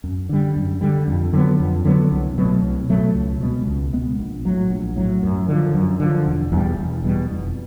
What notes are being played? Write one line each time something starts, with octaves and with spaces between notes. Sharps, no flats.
F#2
D3 G3
F#2
D3 G3
F2
D3 F#3 B3
F2
D3 F#3 B3
C2
B2 F#3 A3
C2
B2 F#3 A3
C#2
B2 G#3 B3
C#2
B2 G#3 B3
A#1
A2 F#3
A#1
A2 F#3
F#2
D3 F3
F#2
D3 F3
E1
E2 B2 G3
E1
E2 B2 G3
F1